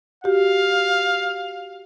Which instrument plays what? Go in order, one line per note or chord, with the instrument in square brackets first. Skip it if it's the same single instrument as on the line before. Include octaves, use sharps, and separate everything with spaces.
[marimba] F#4 G4 [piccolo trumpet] F5